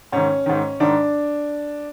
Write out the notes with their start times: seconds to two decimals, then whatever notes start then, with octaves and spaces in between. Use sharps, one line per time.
0.12 G#2 D#3 C#4
0.46 G#2 D#3
0.80 G#2 D#3 D4